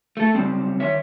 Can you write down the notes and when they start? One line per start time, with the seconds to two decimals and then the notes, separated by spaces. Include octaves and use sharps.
0.17 A3 A4
0.35 C#3 F#3 G3 C4
0.80 D#3 C#5 E5